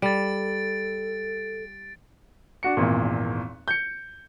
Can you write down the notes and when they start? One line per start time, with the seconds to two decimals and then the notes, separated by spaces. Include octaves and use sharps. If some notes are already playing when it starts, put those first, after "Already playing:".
0.02 G3 A4 A6 D7
2.63 D4 F#4 C#7
2.77 G#1 E2 A#2
3.68 G6 C#7